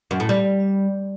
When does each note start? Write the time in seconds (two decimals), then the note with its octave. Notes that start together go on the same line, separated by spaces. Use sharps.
0.11 F#2
0.20 A2
0.29 G3